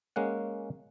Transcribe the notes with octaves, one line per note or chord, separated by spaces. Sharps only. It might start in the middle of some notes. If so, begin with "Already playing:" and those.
G#3 A#3 C#4 F#5